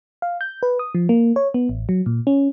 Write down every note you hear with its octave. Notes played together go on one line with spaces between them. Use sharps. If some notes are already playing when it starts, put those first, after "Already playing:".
F5
G6
B4
D#6
F3
A#3
C#5
B3
A1
F#3
A#2
C#4